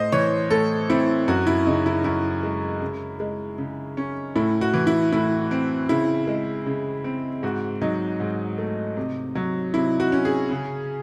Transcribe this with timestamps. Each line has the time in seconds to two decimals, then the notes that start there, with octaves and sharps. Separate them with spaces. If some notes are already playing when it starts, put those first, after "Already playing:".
Already playing: A2 C5 D#5
0.12 E3 C#5
0.50 A2 A4
0.90 C4 E4
1.28 F#2 F#4
1.47 E4
1.66 C#3 D#4
1.86 E4
2.04 F#2 E4
2.43 G#3
2.81 C#3
3.20 G#3
3.58 C#3
3.97 C#4
4.36 A2 E4
4.61 F#4
4.74 E3
4.87 E4
5.12 A2 E4
5.51 C4
5.89 C#3 E4
6.27 G#3
6.66 C#3
7.04 C4
7.43 G#2 F#4
7.81 F#3 D#4
8.20 G#2
8.58 A3
8.97 C3
9.35 F#3
9.74 C3 E4
10.00 F#4
10.12 C#4
10.25 G#4
10.50 C#3